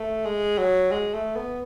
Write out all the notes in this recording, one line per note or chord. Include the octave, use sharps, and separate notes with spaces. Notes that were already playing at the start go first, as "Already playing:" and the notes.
Already playing: A3
G#3
F#3
G#3
A3
B3